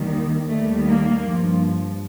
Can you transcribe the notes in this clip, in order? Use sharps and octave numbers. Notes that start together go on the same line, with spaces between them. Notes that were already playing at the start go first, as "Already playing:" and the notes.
Already playing: D#2 D#3 G3
D#2 D#3 G3 A3
A#3
G2 F3